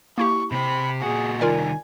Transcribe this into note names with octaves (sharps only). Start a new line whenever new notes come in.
A#3 E4 G4 C#6
C3 C4 B5
A#2 F#4 G#4
C2 D#3 F4 A#4 D5 G#5